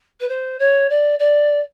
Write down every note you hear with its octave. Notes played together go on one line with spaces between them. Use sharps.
B4
C5
C#5
D5
D5